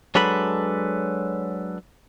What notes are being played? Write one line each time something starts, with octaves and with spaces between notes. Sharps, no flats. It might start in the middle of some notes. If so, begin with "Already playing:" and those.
F#3 G#3 D4 A4 B4 B5